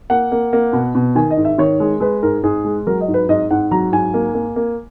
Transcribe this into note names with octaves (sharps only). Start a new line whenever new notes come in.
A#3 F#5
A#3
A#3
B2
B2
D#3 G#5
D#5
G#2
E5
D#3 C#5
G#3
G#3 B4
G#2 A#4
G#2 G#4
G#3
F#3 A#4
D#5
G#2
B4
G#2 D#5
G#2 F#5
F#3 A#5
G#2 G#5
A#3
A#3
A#3